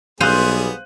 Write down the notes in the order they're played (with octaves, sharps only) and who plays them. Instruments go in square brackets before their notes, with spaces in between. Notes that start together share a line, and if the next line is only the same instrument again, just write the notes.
[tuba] B1 [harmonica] G3 B3 G#4 [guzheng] C5 F5 [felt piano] F#6 D#7